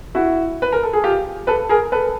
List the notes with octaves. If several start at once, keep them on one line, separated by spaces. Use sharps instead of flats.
E4 F#4
B4
A#4
A4
G#4
F4 G4
A4 B4
G#4 A#4
A4 B4